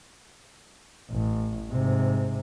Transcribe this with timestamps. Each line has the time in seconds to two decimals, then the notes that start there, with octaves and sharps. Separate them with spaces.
1.11 A1
1.71 G#2 C3